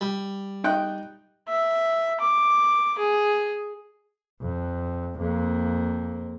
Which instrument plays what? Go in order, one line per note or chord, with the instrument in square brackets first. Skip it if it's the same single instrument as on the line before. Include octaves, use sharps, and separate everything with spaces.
[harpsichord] G3
[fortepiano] D#4 G5 F#6
[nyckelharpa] E5
D6
G#4
[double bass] F2
F2 A#3